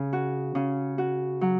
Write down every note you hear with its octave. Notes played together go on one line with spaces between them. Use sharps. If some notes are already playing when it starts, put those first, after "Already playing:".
Already playing: C#3
F#4
C#3
F#4
F#3